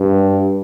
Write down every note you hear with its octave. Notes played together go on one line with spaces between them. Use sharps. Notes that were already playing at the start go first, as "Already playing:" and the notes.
Already playing: G2